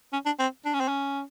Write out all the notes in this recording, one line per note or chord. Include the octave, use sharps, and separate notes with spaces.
C#4
D4
C4
D4
C#4
C4
C#4